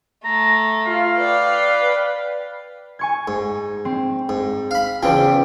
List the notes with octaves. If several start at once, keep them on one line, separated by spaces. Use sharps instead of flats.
A3 A#5
F4 F5
B4 D5 G5
G#5 C#6 G#6
G#2
C4
G#2
F5 B5
E2 C#3 F3 G5 D6